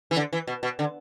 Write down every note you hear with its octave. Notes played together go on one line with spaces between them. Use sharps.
E3
D3
E3
B2
B2
D3